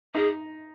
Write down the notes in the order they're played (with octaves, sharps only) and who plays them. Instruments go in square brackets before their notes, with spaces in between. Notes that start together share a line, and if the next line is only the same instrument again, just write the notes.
[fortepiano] D#4 [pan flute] G#4